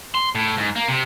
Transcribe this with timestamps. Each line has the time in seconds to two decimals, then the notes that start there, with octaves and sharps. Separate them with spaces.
0.15 C6
0.35 A2
0.58 G#2
0.76 A#3
0.89 C3